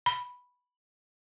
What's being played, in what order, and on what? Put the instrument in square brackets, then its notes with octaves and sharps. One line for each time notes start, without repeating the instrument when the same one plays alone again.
[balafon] B5